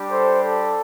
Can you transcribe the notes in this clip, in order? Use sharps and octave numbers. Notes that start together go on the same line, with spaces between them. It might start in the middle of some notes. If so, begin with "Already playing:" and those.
Already playing: G3 D4 G4
A4 C5
A4